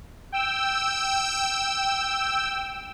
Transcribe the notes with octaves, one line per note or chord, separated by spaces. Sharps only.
G5 E6